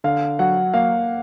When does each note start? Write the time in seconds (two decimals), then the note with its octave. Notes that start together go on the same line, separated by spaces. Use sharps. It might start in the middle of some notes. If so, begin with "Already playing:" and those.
0.04 D3 F5
0.39 F#3 F#5
0.74 A#3 F5